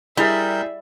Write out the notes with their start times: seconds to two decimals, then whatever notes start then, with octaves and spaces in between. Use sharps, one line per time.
0.17 G3 E4 G#4 A#4 E5 G6